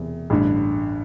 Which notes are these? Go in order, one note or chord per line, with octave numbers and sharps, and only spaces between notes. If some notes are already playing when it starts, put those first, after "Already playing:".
Already playing: E1 E2 C3
A1 G2 D3